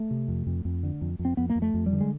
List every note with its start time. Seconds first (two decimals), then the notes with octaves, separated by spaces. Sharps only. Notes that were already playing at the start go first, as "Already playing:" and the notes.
Already playing: A3
0.11 C3
0.28 F2
0.47 F2
0.65 F2
0.83 D3
1.01 F2
1.19 F2
1.25 C4
1.37 F2 B3
1.50 A#3
1.55 F2
1.62 A3
1.74 F2
1.86 G3
1.93 D3
2.01 G#3